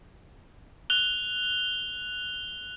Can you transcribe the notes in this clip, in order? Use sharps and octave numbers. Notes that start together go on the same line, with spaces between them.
F#6 F7 G7